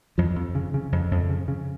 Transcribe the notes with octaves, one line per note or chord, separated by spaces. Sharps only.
F2 F3
F2
C#3
C#3
F2
F2
C#3
C#3